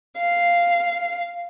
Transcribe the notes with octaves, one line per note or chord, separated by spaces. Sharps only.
F5